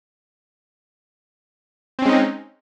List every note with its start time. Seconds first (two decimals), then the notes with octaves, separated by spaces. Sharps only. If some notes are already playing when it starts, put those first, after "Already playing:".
1.99 C4
2.02 C#4
2.06 G#3
2.09 D#4